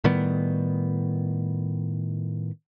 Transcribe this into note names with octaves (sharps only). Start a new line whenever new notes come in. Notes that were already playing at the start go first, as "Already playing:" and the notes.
A2 D#3 G3 B3